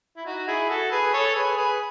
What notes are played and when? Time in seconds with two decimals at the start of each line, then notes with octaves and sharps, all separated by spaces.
0.17 E4
0.25 D#4 F#4
0.47 E4 G#4
0.69 F#4 A4
0.91 G#4 B4
1.13 A4 C#5
1.35 G#4 B4
1.57 G#4 B4